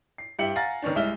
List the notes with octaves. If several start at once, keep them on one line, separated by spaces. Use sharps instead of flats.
C7
G2 E4 G4 E5 C#7 F#7
F5 F#5 G#5 A#5 A6 A#6
D#3 B3 C#4 D4
C2 G#3 E4 E5 F6 G7